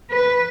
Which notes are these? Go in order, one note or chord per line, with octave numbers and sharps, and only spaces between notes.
B4